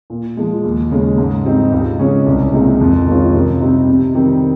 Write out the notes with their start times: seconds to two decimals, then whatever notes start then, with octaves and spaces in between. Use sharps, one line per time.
0.10 A#2
0.37 F3 G#3
0.64 D#2
0.91 C#3 G#3
1.18 G#2
1.45 G3 C4 D#4
1.72 C#2
1.99 C#3 G#3 C#4
2.26 C2
2.53 A#2 G#3 C4 D#4
2.80 F2
3.07 D#3 G#3 C#4 F4
3.35 C3
3.61 G3 C4 D#4
3.89 C3
4.15 D#3 G3 C4